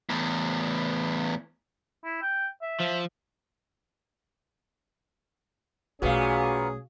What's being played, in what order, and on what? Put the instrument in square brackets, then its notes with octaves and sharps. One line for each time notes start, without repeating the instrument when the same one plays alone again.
[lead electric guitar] E2 A2
[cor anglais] E4
G5
E5
[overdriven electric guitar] F3
[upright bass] B1 A3 [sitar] A#2 B3 [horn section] C#4 G#4 [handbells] F#4 F5